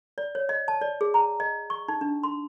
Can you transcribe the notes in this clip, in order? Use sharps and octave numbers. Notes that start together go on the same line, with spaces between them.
D5
C#5
D#5
A5
D5
G#4
A#5
D#5
C#6
D#4
D4
C6